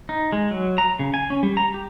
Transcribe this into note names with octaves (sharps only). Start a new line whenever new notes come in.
D#4
G#3
F#3
A#5
C#3
G#5
C#4
G3
A#5
G4